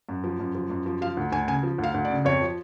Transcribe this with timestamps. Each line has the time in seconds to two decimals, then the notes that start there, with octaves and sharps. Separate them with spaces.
0.09 F#2
0.24 F3
0.39 F#2
0.55 F3
0.70 F#2
0.86 F3
1.01 F3 F5
1.17 D2
1.32 D2 G#5
1.47 C#3 G#5
1.63 F3
1.78 D2
1.84 F5
1.94 D2
2.05 D5
2.10 C#3
2.25 F2 C#5
2.41 F3